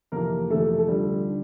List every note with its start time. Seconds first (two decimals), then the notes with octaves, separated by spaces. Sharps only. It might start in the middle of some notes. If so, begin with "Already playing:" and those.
0.12 F2 C3 E3 A#3 A#4
0.50 F2 C3 E3 A3 A4
0.79 A4
0.88 D2 D3 F3 G3 G4
1.28 D3